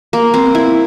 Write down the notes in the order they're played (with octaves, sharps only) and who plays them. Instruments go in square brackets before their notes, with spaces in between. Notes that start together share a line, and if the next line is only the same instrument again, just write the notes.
[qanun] A#3
C4
E4